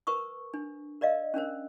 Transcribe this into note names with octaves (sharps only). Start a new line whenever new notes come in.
A#4 B4 C#6 D#6
D4
A#4 D5 D#5 F5
C#4 D4 A#4 C5